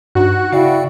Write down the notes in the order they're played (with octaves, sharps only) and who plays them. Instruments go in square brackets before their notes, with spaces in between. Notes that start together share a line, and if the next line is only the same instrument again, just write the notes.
[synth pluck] G2 D#4 [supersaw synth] F#4 [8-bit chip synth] F#6
[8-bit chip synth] C#3 D5 G5 [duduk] E4 [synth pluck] F5